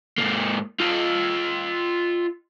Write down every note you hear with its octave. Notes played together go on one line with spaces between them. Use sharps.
G#2 A#3
F4 D#5